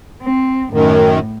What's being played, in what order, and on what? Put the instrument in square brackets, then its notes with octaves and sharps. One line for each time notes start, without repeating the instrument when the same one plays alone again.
[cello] C4
[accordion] F#2 D#3 [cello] A2